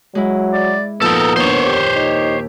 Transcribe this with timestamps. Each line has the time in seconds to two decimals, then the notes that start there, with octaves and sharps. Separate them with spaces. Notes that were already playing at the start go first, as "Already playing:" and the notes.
0.15 F#3 G#3 E4
0.53 D5
1.02 A#2 F3 B3 D#4 A4 A#4 E6
1.37 D#2 D4 C5 C#5
1.65 G4
1.96 D#4